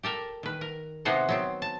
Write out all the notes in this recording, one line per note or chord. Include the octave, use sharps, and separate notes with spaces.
G4 A4 A#4
D#3 B4
A#4
C3 G#3 B3 D#4 C5 F#5
F#3 B3 C4
A5